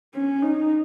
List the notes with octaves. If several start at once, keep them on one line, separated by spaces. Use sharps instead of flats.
C#4
D#4